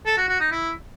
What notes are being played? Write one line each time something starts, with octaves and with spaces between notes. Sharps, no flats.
A4
F#4
F#4
D#4
E4